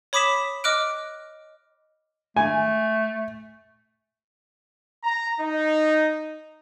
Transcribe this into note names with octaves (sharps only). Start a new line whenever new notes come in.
C#5 B5 D6 D#6 B6 E7
D#5 D6 F6 F#6 D7
A3 G#5
A#5
D#4